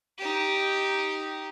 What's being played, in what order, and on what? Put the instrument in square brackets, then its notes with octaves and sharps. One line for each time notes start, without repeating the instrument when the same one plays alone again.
[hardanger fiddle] D#4 G4